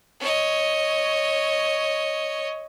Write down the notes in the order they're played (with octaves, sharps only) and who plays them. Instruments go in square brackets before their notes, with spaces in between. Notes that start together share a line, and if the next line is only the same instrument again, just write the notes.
[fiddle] C#5 D#5